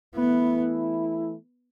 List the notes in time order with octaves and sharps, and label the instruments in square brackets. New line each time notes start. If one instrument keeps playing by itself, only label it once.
[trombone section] E3 A3 E4 [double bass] B3